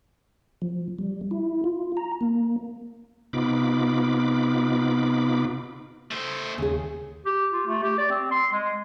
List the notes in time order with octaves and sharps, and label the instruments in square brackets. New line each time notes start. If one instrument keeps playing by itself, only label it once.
[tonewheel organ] F3
G3
E4
F4
A#5
A#3
C3 B3 D#4 F4 B5 D6
[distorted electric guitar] A3 C5
[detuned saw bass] D#2 [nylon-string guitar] C#3 G#4
[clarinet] G4
F4
A3
G4
D5
C4
C6
G#3